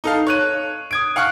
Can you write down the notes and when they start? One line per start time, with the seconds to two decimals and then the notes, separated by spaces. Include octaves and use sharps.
0.04 D#4 A4 F5
0.27 C#5 F#6 D#7
0.91 D#6 G#6 D7
1.16 F5 F#5 C#6 F6 F#6